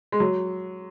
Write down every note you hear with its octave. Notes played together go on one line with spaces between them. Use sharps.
G#3
F#3